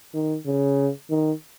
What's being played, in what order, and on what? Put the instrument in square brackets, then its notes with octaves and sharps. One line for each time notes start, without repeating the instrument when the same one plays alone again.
[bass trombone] D#3
C#3
D#3